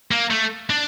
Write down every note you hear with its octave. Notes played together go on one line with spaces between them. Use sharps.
A#3
A3
D4